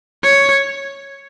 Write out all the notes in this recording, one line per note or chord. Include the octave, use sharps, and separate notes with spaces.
C#5